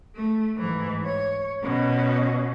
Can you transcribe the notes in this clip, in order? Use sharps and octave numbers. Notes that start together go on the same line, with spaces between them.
A3
G#2 E3
C#5
B2 C#4